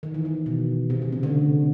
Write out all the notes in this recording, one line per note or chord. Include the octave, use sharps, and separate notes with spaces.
D#3
E3
E3
B2
C3
C#3
C3
D3